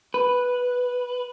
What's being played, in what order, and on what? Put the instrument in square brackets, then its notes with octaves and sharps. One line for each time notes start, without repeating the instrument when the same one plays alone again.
[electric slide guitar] B4